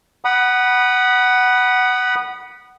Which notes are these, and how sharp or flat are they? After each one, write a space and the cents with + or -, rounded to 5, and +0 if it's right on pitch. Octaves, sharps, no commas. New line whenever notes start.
F#5 +15 B5 -15 D#6 -20